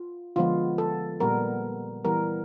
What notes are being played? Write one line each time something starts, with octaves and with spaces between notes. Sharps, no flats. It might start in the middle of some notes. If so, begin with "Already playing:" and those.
Already playing: F4
D3 F3 G#3 B3 F4
A4
A#2 G3 B3 A#4
E3 G3 B3 A#4